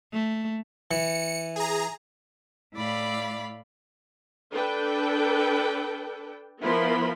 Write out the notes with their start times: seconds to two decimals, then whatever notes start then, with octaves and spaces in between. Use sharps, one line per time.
0.13 A3
0.91 E3 C#7
1.56 G#4 A#5
2.75 A2 E4 D5 F5 B5
4.50 D4 A4 B4 G5
6.61 F3 B3 E4 A#4 B5 C6